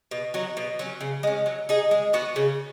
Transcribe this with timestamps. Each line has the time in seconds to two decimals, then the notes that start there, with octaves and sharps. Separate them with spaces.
0.11 B2
0.34 F#3 D#4 F#4
0.57 B2
0.79 F#3 C#4
1.01 C#3
1.23 G#3 C#4
1.46 F#3
1.69 D#4 G#4
1.91 G#3
2.13 B3 F#4 B4
2.36 C#3